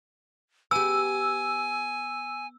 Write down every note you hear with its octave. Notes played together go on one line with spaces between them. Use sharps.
B3 G4 G#5 E6